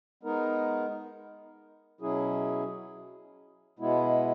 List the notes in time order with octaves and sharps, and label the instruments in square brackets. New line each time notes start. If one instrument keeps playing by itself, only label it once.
[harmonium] G#3 B3 D#4 A#4
B2 F#3 C#4 E4 G#4
B2 G#3 B3 E4